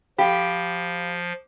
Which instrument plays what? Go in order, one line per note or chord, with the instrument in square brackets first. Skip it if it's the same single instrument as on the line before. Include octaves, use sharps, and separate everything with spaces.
[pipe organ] F3 [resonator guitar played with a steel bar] G4 [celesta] F5 B5